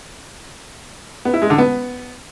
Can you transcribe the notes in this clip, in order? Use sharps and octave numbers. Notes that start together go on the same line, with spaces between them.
B3
E4
G#3
D3
B3